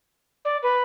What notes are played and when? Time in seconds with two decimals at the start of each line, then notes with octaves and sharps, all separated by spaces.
0.45 D5
0.62 B4